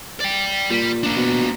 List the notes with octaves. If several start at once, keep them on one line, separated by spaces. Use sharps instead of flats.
D5 G5
A#2 G3
A#3 D4
B2